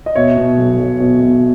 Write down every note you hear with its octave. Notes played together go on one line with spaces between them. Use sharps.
D#5
B2 C#5 E5
B2
B1
B1
B2
B2